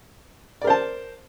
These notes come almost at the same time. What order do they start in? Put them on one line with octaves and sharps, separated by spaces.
D5 A#4 C5 A5